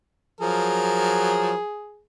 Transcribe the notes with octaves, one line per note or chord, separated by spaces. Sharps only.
F3 F#3 G#4 A#4